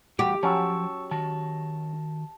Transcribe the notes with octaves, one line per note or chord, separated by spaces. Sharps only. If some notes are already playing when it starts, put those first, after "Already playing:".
E2 G3 F#4 G4
F3 F#3 C#4 A5 C#6 E6
D#3 F#4 A5